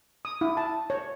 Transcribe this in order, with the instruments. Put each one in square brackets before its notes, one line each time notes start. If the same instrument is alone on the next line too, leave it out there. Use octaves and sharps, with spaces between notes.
[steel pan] D#6
E4
A5
C#5